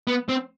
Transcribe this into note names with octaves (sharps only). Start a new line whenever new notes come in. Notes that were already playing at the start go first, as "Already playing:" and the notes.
B3
C4